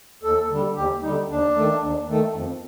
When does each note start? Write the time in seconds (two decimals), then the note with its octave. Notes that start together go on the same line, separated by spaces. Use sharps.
0.23 D#2 A4
0.50 D3 G3
0.76 D#2 G4
1.02 D3 G3 D#4
1.29 D#2 D4
1.55 D#3 A3
1.82 D#2
2.07 D#3 A3
2.34 F2